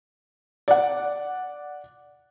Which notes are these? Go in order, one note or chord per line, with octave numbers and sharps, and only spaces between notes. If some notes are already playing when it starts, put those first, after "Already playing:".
D5 F#5